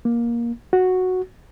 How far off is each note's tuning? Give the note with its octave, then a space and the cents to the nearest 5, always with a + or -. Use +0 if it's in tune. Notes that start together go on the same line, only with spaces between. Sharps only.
A#3 +15
F#4 -5